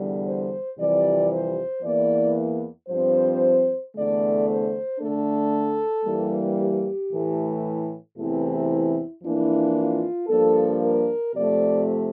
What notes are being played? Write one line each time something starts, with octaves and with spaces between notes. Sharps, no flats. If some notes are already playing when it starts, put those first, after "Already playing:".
Already playing: E2 D3 G3
C5
F2 C3 E3 G3 D5
C5
E2 E3 A#3 D5
G2 F3 C4 C5
E2 D3 A3 D5
C5
D3 A3 D4 A4
G2 E3 G3 A#3
G4
A2 E3 A3
E2 C3 E3 A3 C4 E4
F2 E3 A#3 D4 E4
F4
G2 F3 A#3 D4 A4
A#4
C3 F3 A3 D5